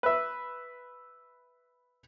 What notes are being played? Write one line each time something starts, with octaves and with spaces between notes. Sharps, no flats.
B4 E5